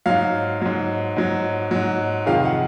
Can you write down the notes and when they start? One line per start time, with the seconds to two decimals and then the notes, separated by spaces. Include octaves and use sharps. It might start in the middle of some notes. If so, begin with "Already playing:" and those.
0.06 G#2 F#3 F5
0.62 G#2 F#3
1.16 G#2 F#3
1.71 G#2 F#3
2.26 F2 C3 D#3 G#3 F5
2.45 F#5